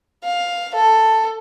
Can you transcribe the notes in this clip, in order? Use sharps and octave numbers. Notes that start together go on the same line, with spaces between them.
F5
A4